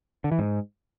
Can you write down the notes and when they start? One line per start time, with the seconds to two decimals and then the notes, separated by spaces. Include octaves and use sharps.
0.24 D3
0.32 E3
0.39 G#2